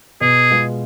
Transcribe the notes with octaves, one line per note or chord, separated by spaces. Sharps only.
B2 G#4
G#3 B3 F4